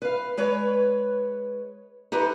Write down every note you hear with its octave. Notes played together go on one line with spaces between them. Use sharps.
B4 F5
G#3 B4 C#5
D#4 E4 G4 A4 B4 C5